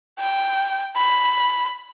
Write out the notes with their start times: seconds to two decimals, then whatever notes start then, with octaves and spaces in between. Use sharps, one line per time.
0.19 G5
0.96 B5